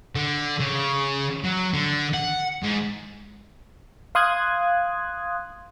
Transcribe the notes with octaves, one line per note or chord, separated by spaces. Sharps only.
D3
C#3
F#3
D3
F#5
G#2
F5 C6 D#6 F#6 G#6